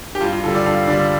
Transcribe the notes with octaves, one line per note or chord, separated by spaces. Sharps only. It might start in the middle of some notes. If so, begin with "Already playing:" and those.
G4
G2 F4
F4
D3 G3 A4
D5
G2 F5
D3 G3 D5